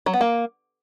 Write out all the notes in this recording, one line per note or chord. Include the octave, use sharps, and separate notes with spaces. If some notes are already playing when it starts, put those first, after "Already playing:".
F#3
B3
A#3